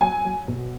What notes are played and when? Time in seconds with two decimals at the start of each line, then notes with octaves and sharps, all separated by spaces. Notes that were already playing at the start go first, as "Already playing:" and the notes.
0.01 F#3 G#5
0.25 F#3
0.48 B2